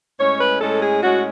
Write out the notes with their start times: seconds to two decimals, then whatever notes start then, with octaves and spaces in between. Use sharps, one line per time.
0.20 A2 G#3 C#4 C#5
0.41 B4
0.61 A2 G#3 C#4 A4
0.82 G#4
1.03 A2 G#3 C#4 F#4